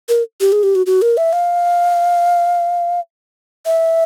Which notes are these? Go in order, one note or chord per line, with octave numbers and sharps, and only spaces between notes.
A#4
G4
G#4
G4
F#4
F#4
A#4
E5
F5
E5